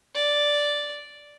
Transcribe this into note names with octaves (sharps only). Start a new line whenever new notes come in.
D5